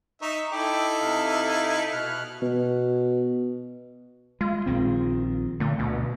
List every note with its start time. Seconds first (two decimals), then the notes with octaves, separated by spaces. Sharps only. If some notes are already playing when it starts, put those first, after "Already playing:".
0.22 D#4 E5 A#5 C#6
0.52 D#4 E4 A4 G5 D6
1.01 C3 F5
1.93 B2 F6 F#6
2.42 B2
4.41 G#3 F4
4.66 A#1 D#3 C4
5.60 A#2 D3 A3
5.79 D2 B2